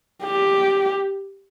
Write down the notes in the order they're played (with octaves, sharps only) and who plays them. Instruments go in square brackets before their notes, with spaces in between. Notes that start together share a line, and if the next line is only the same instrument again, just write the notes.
[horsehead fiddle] G4